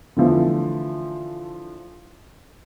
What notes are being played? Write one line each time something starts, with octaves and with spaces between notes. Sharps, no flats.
D3 E3 F3 A3